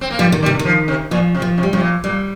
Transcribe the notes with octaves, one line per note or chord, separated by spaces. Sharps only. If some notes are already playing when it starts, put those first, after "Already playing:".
C4
A#3
F3 G3
D#3
G3
C3
D#3
F3
C3
A#2 F3
C3
F3
C3
G3
C3 F3
A#2
A#2 G3